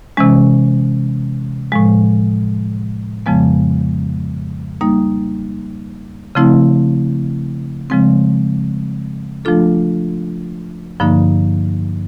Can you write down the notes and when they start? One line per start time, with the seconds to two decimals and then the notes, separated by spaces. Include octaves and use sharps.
0.17 C3 E3 G#3 C#4
1.72 A2 F3 G#3
3.26 F2 C#3 F3 G#3 B3
4.81 G3 A#3 D#4
6.35 C#3 F3 A3 C4 E4
7.90 C#3 F3 G#3 C4
9.45 F3 A3 D4 F4 A4
11.00 G2 D3 F3 A#3 D#4